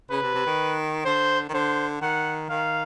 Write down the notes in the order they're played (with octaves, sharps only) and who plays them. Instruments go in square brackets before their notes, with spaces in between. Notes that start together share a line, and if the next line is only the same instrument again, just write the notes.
[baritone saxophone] C#3 [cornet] B4
[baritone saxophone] C3
C3
D#3
[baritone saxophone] D3 [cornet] C5
[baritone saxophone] D#3
[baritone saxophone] D3 [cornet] C5
[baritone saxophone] D#3 [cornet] F#5
[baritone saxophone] D#3 [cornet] F5